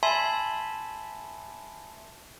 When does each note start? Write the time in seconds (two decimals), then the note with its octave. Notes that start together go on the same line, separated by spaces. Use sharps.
0.03 E5 G#5 A5 B5 C6